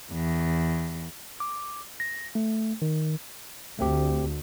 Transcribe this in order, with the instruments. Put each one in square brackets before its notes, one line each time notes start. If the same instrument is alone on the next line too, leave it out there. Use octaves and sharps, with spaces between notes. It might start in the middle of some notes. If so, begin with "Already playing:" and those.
[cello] E2
[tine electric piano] D6
A#6
A3
D#3
[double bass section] D2 [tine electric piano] A3 C4 G4